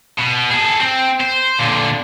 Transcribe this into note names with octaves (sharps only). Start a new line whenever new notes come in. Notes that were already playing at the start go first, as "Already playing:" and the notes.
B2
G#4 A4
C4
C5
A#2 D3